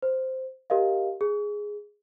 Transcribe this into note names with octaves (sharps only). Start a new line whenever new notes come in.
C5
G4 A#4 D#5 F5
G#4